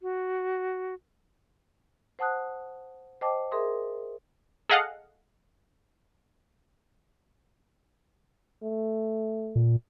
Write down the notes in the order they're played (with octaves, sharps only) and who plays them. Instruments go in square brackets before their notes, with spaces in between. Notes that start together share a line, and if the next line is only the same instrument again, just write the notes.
[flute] F#4
[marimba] C5 F#5 A5 D#6 F#6
C5 D#5 G5 A5 D6
G#4 A#4 E5 C6 D#6
[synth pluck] G#4 A4 D#5 F5 F#5
[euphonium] A3
[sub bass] A#2